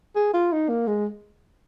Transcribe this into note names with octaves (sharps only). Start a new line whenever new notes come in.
G#4
F4
D#4
A#3
G#3